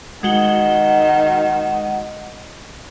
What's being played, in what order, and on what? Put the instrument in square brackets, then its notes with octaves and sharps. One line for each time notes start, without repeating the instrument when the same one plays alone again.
[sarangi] D#3 [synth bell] G#3 F#4 G7 [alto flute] F#5